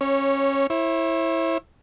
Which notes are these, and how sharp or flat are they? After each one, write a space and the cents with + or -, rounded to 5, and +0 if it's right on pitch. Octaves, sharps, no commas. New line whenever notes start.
C#4 -20 C#5 +0
E4 +0 C#5 -45